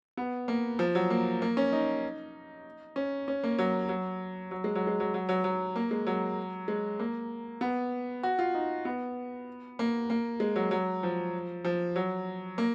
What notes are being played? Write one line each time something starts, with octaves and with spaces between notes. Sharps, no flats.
B3
A#3
F3
F#3
A#3
A#3
C#4
D#4
C#4
C#4
A#3
F#3
F#3
F#3
G#3
F#3
G#3
F#3
F#3
F#3
F#3
A#3
G#3
F#3
G#3
A#3
B3
F#4
F4
D#4
B3
A#3
A#3
G#3
F#3
F#3
F3
F3
F#3
A#3